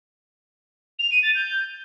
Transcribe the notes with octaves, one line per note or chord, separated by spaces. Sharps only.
F7
D#7
A6
G6